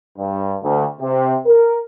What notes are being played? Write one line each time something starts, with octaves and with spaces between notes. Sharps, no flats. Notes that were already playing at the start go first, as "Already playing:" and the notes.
G2
D2
C3
A#4